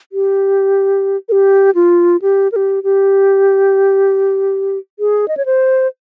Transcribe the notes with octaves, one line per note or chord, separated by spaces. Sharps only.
G4
A#4
G4
F4
G4
A#4
G4
G4
G#4
D#5
C#5
C5